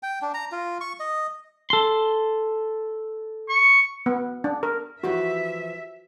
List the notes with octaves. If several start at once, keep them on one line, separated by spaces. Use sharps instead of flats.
G5
D4
A#5
F4
C#6
D#5
A4 C6
C#6
B3
D4
A#4
E3 F3 F#4 G4 E5